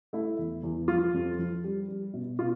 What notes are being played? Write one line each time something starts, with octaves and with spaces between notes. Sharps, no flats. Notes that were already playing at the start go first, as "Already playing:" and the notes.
A3 E4
E2
E2
F3 F4
F2
F3
G3
G3
B2
B2 F4